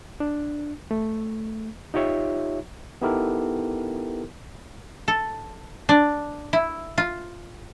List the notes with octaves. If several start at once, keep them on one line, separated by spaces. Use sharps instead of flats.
D4
A3
D#4 F4 G4 C#5 E5
B3 D#4 E4 G4 A4 A#4
A4
D4
E4
F4